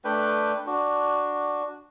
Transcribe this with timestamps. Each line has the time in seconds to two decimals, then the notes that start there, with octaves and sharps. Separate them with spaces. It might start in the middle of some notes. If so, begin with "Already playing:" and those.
0.05 A3 D4 B4 G5
0.67 D4 F#4